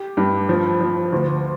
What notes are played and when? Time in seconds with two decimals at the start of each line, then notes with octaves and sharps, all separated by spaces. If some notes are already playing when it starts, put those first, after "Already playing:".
Already playing: G4
0.17 G2
0.49 F3
0.81 F3
1.12 D2